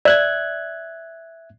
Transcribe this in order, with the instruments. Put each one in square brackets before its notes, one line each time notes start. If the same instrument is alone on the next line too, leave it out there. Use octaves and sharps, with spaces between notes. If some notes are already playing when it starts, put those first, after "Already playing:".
[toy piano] D5 [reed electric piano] E5 F#6 G#6